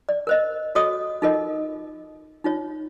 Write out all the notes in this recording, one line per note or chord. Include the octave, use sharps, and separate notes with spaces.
D5
A#4 C5 D#5
F#4 A4 C#5 D#5 D#6
D#4 F4 A4 A#4 D#5
D#4 F4 C#5